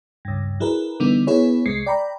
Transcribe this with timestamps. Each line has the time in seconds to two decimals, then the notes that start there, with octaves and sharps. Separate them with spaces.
0.25 C#2 G2
0.60 F#3 E4 G#4 A#4 B4
1.00 D3 E3 G3 B3 D#4
1.27 B3 E4 G#4 B4 C#5
1.66 C2 G#3 C7 C#7
1.86 D5 G5 A#5 B5